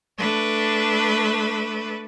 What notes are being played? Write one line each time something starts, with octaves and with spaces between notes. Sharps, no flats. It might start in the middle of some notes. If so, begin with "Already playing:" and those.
A3 D4 B4